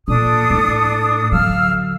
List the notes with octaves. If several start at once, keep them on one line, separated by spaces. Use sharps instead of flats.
A#2 D4 A4 D#6
A2
D3 F#3 F5 E6 F6